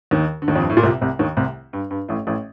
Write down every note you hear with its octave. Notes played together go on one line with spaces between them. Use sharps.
D#2 D#3
D3
D#2 D#3
F2
G2
A2
A#2
C2 C3
C2 C3
D#2 D#3
C2 C3
G2
G2
A1 A2
A1 A2